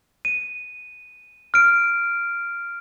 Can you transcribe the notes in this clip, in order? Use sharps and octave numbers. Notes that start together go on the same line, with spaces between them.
D#7
F6 D7